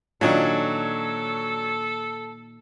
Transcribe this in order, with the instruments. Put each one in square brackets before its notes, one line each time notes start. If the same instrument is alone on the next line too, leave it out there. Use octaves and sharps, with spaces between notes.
[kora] A#2 D#3 [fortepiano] F#3 C#4 D4 [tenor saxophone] A4